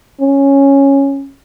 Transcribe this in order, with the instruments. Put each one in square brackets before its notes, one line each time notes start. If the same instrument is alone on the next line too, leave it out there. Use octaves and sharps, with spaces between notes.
[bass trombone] C#4